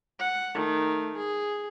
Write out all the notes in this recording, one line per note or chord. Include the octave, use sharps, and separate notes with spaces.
F#5
D#3 A3
G#4